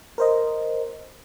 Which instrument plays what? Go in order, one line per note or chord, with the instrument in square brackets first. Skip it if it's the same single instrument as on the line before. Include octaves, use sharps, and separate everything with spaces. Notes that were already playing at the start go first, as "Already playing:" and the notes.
[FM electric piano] A#4 C5 D#5